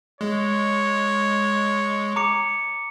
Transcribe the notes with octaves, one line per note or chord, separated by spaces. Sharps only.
G#3 C#5
A#5 D6 C#7